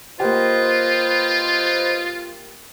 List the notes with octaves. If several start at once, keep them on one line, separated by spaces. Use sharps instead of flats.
A#3 F4 G4 B4 C5 D#5